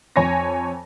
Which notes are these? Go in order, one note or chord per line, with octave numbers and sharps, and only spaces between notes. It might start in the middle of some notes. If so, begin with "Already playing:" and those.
F2 C#5 G#5 C#6 A#6